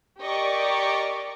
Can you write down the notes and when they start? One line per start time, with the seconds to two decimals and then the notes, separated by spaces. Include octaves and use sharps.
0.22 G4 A#4 D5 D#5 C#6 D6